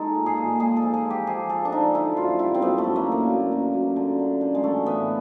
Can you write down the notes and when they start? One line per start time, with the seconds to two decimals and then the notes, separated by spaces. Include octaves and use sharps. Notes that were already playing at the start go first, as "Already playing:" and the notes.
Already playing: G#3 D#4 A4
0.15 A#2
0.26 G#4
0.37 A#2
0.60 G#3 G#4
0.76 A4
0.82 F3
0.94 G#4
1.04 G#3
1.10 G4
1.27 F3 G#4
1.49 F3 A4
1.65 D4
1.72 F3 D#4
1.94 D3 E4
2.17 F#2 F4
2.39 G3 E4
2.54 C4
2.61 F#2 B3
2.78 A3
2.84 F#2
2.96 A#3
3.07 D3
3.12 A#3
3.29 F#2
3.52 F#2
3.74 F#2
3.96 D3
4.19 D3
4.41 D3
4.55 G#3
4.64 E3 A3
4.86 A2 B3